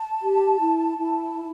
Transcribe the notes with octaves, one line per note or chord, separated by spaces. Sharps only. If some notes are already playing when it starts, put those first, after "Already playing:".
Already playing: A5
G4
E4
E4